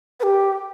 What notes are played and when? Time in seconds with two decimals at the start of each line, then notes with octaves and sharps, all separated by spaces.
0.20 B4
0.23 G4